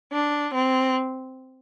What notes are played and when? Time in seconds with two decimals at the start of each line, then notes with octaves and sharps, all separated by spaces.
0.12 D4
0.54 C4